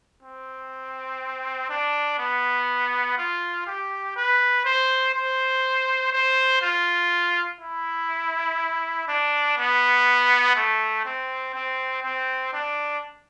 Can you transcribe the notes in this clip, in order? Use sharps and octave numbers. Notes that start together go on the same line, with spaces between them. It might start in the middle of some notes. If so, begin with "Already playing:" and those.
C4
D4
B3
F4
G4
B4
C5
C5
C5
F4
E4
D4
B3
A3
C4
C4
C4
D4